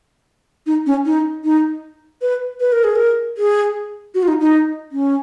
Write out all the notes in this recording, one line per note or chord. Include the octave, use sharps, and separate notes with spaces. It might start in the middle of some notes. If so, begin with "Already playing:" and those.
D#4
C#4
D#4
D#4
B4
B4
A#4
G#4
A#4
G#4
F#4
F4
D#4
D#4
C#4